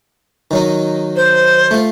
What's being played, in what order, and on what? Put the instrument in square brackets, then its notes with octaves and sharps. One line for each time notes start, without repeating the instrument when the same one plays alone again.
[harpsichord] D#3 F#3 D#4
[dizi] C5
[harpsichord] A3 F4